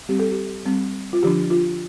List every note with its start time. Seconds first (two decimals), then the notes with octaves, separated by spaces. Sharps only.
0.09 G3 C4 G4
0.19 A4
0.32 G4
0.65 G3 C4
1.13 F4
1.23 D3 F3 D4 G4
1.50 F4